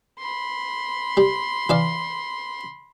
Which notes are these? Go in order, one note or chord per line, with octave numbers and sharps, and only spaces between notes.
B5 C6
G3
E3 D5 F5